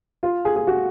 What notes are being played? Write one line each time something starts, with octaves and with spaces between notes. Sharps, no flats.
F4
G#4
G#4
F#4